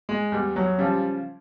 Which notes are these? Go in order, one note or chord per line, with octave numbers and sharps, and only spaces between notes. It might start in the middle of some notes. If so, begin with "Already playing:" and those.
G#3
E2 G3
F#3
C#3 F3 G3